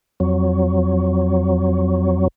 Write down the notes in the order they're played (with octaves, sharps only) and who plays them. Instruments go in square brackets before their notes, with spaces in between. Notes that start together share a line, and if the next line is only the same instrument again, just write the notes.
[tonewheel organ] F2 F#3